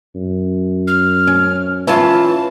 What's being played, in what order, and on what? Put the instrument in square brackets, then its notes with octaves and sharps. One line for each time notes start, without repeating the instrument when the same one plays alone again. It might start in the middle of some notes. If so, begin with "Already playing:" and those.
[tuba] F#2
[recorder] F6
[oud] C#4
[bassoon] E3 [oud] C#4 F4 [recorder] A5